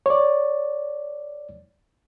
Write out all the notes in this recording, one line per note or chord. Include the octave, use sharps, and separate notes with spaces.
C#5 D5